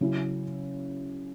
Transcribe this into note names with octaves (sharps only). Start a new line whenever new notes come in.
C#3 F#3 C#4 E4